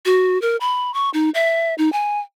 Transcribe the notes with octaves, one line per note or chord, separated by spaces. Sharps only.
F#4
A#4
B5
C#6
D#4
E5
D#4
G#5